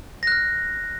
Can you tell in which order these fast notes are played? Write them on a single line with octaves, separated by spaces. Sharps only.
A#6 F#6 F6